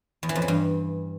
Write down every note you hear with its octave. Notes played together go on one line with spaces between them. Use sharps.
E2
E3
F2
E3
G2